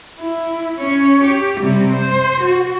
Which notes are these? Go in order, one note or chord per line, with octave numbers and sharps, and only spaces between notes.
E4
C#4 C#5
G4
C3 G3
C5
F#4